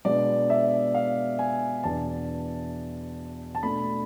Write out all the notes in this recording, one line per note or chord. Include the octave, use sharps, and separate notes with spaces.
B2 G#3 B3 D4 D5
E5
F5
G#5
E2 B2 B3 D4 A5
A5
B2 A3 D4 B5